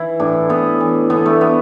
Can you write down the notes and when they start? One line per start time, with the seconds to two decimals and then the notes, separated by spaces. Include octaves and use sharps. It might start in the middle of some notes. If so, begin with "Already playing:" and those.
Already playing: E3 E4
0.20 A2 D4
0.49 A2 B3
0.80 E3
1.10 D3 B3
1.26 A3
1.41 B3